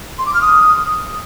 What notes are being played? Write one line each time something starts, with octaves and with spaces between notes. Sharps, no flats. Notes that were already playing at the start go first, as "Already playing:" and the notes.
C6
D6
F6
D#6